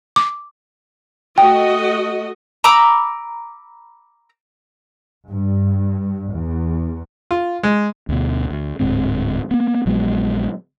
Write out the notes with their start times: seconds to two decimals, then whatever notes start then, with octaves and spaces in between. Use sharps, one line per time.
0.16 D6
1.38 A3 F#4 D#5 G5
2.64 A#5 B5 D6 E6
5.28 G2
6.32 E2
7.31 F4
7.63 G#3
8.09 D2 B2
8.51 D2
8.79 D1 G#2 D3 C4
9.51 A#3 B3
9.86 A#1 F#3 G#3 B3